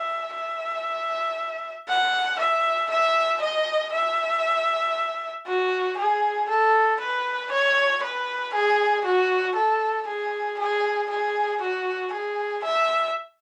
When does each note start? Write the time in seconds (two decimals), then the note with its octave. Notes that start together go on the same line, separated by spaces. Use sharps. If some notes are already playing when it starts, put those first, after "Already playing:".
Already playing: E5
0.34 E5
1.88 F#5
2.39 E5
2.90 E5
3.42 D#5
3.93 E5
5.47 F#4
5.98 G#4
6.49 A4
7.00 B4
7.52 C#5
8.03 B4
8.54 G#4
9.05 F#4
9.56 A4
10.07 G#4
10.59 G#4
11.10 G#4
11.61 F#4
12.12 G#4
12.64 E5